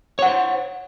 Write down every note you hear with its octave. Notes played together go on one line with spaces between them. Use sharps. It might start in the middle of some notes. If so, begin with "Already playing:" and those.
C5 C#5 F#5